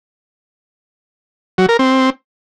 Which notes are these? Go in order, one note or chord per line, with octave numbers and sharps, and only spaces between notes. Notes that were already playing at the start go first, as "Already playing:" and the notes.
F#3
A#4
C4